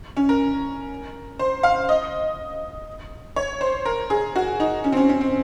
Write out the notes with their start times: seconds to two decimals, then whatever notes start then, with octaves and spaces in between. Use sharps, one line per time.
0.17 C#4
0.29 A#4
1.39 C5
1.63 F5
1.89 D#5
3.36 C#5
3.61 C5
3.85 A#4
4.10 G#4
4.36 F#4
4.60 D#4
4.84 C#4
4.92 C4
4.97 C#4
5.09 C#4
5.21 C4